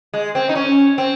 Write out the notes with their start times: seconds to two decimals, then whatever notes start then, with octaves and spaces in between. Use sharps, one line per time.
0.14 G#3
0.35 C4
0.49 D#4
0.55 C#4
0.98 C4